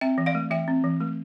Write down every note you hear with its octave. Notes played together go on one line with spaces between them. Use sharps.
C4 E5 G5
E3
D5 F5
A3
E3 E5 G5
C4
E3
A3